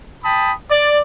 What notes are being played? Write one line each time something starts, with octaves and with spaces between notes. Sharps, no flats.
G5 A5 B5 D#6
D5